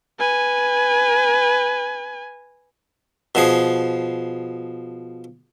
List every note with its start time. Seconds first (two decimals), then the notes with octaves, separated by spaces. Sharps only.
0.19 B4 G#5
3.35 B2 F3 G#4